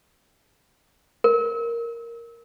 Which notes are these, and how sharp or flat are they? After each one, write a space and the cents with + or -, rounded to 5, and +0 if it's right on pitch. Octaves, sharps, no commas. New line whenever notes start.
A#4 +0